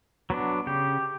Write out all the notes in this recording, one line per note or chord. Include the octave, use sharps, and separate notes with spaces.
F#3 B3 D4
C#3 G4